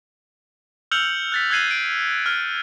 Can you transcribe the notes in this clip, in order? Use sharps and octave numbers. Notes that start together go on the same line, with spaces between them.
E6 F6 G6 C#7 F7 F#7
F#6 A6 B6
E6 F#6 G#6 C7 D#7 F#7
D7
F6